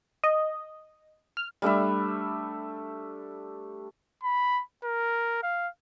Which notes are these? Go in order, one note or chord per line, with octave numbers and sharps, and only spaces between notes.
D#5
F6
G3 A3 D4 E5
B5
A#4
F5